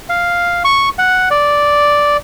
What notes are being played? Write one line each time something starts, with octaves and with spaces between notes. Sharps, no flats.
F5
C#6
F#5
D5